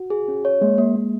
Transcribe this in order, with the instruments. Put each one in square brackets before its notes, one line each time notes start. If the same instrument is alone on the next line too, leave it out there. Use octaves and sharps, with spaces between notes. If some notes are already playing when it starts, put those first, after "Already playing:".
Already playing: [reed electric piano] F#4
[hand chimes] G#4
C#4
C#5
[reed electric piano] G#3 [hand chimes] A#3
[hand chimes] A#3
A#3